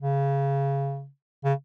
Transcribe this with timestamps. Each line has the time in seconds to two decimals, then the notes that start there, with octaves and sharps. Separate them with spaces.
0.02 C#3
1.44 C#3